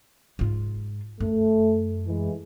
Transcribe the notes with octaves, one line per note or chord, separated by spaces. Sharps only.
G#2 F4
F#2 A3
E3 G#3